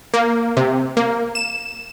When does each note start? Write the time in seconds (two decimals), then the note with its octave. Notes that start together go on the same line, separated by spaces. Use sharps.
0.14 A#3
0.57 C3
0.97 A#3
1.35 E7